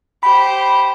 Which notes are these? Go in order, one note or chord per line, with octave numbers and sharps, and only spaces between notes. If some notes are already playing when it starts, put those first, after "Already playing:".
G4 C5 B5